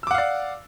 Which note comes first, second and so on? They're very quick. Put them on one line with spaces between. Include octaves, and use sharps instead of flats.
E6 D6 F#5 F5 D5